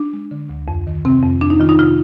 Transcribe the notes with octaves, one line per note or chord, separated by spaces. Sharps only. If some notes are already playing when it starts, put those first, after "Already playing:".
Already playing: D4
G#3
D3
D2
F2
D#3
C3 C4
F2
F2 D4
D#4
D#3 F4
D#4
C3 F4